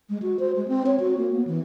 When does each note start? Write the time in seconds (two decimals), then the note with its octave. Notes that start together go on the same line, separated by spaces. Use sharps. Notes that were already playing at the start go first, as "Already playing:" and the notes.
0.09 G#3
0.22 F#4
0.39 C5
0.56 G#3
0.68 C4
0.86 C#5
1.00 F#4
1.17 A#3
1.33 B3
1.47 E3